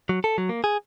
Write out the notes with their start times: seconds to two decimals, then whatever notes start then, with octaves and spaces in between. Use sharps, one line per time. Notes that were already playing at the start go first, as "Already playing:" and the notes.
0.09 F#3
0.24 A4
0.38 F#3
0.49 A#3
0.64 G#4